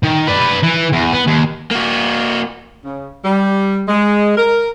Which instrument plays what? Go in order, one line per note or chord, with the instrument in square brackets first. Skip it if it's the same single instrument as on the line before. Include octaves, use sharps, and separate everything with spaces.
[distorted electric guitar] D#3
B4 D5
E3
E2
B3
D#2
[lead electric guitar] A#3 F#4
[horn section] C#3
G3
G#3
A#4